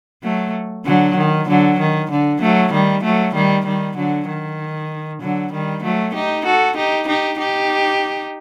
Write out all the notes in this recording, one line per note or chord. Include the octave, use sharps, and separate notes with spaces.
F#3 A3
D3 F#3
D#3
D3 F#3
D#3
D3
F#3 A3
D#3 G3
F#3 A3
D#3 G3
D#3 G3
D3 F#3
D#3
D3 F#3
D#3 G3
F#3 A3
D#4 G4
F#4 A4
D#4 G4
D#4 G4
D#4 G4